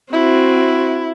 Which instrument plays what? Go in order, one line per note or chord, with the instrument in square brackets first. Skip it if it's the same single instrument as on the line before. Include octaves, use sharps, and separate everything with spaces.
[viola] C4 F#4 [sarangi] E4